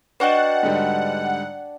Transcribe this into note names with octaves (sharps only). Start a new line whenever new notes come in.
D4 F#4 B4 D#5 F#5 G5
G#2 D3 G3